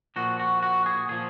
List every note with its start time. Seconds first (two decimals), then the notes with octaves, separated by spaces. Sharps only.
0.16 A#2 F3 F#4
0.40 F#4
0.63 F#4
0.86 G#4
1.09 A#2 F3 G#4